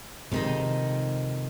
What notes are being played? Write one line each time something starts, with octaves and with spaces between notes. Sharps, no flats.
F2 C3 D#3 G#3 D#5